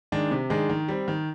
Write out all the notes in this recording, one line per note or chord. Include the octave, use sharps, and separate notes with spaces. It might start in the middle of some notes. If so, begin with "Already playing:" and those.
D#3 G#3 D4
C3
D#3 G#3 D4
D#3
G3 C4
D#3